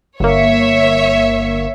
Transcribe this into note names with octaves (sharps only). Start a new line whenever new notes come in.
G1 A#3 C#5 E5